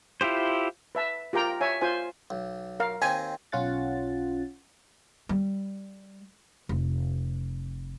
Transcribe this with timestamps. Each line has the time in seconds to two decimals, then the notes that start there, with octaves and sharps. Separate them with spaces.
0.21 E4 F4 G4 C5
0.95 B4 E5 A5
1.33 F4 G4 A#4 G5 A#5
1.61 C#5 E5 G#5
1.81 F4 C5 G#5
2.30 B1
2.80 A#4 F5
3.02 D#2 C4 D#5 G#5
3.52 B1 C#4 F4 F#5 A6
5.29 G3
6.69 F1